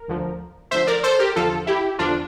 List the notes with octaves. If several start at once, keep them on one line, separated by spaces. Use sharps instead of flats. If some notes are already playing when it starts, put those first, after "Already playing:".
Already playing: A#4
D2 D3 F3
D2 D3 F3 C5 E5
A#4 D5
A4 C5
G4 A#4
E2 D3 F3 F4 A4
E4 G4
E2 D3 F3 D4 F4